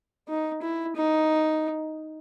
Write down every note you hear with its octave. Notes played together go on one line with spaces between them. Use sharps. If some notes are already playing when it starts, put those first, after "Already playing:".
D#4
E4
D#4